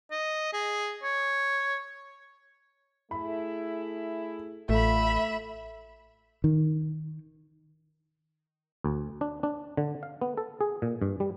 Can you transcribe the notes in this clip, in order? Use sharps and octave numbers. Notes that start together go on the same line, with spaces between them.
D#5
G#4
C#5
A3 E4 G#4 B5
A1 D3 A3 F4 A4 E5 B5
D#3
D2
D4
D4
D3
F5
B3
A4
G#4
A#2
G2
G3